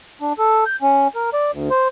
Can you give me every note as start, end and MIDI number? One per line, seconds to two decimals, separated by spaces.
0.21 0.33 62
0.38 0.64 69
0.66 0.76 91
0.82 1.08 61
1.15 1.30 70
1.33 1.51 74
1.53 1.69 38
1.70 1.88 72